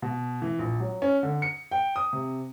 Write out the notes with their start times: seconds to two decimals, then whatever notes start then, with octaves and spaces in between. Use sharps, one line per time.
0.02 B2
0.42 E3
0.59 A#1
0.80 F#3
1.02 C#4
1.23 D3
1.42 C#7
1.71 G5
1.96 D#6
2.13 C3